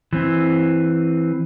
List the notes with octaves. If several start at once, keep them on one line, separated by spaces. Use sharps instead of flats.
E3 C4